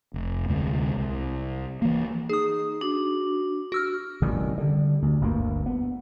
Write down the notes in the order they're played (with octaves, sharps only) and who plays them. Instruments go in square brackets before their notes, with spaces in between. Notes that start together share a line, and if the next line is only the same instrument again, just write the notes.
[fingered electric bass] F1
D2 C3 G#3
C2
E3 A#3
[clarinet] D#4 [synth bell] G#4 D#6
[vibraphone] D4 [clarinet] F#4
[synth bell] F#4 E6 F6
[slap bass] A1 C3 D#3 G3
D3 G3
D2
G1 D2 G2 A#3
B3